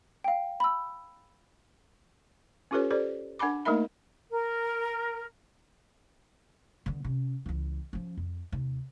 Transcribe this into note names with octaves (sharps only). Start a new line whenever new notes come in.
F5 G5
B5 E6
C#4 F4 G4 A4 B4 C#5
G4 A4 C5 D5
D4 F#5 G#5 B5 D6
A3 A#3 D#4 A#4 E5 B5
A#4
D3 B3
C3 C#4
C#2 E3
F3 C#4
F2
D#2 C3